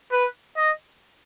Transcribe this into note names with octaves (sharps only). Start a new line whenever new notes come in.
B4
D#5